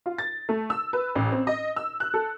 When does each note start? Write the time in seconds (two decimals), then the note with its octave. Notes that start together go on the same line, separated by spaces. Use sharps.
0.06 F4
0.18 A6
0.49 A3
0.70 E6
0.93 B4
1.15 A1
1.32 C4
1.47 D#5
1.76 E6
2.00 F#6
2.14 A4